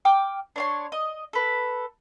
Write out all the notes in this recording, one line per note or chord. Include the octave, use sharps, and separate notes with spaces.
G5 D6 F6
D4 C#5 C6
D#5
A4 B4